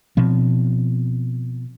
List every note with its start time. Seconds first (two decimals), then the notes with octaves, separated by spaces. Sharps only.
0.17 B2 F3 C4